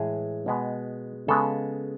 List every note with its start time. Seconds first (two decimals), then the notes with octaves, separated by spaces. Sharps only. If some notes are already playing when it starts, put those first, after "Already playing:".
Already playing: A2 E3 G#3 G#4
0.46 B2 G#3 B3
1.28 C#3 G#3 B3 A4